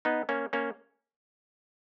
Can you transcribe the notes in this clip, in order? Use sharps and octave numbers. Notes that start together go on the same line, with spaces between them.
B3 D#4
A#3 C#4
A#3 C#4